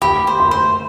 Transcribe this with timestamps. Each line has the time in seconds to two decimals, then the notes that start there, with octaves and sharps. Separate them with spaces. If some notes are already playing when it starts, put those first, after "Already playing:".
0.02 G4 B5
0.27 C5
0.40 C6
0.51 C5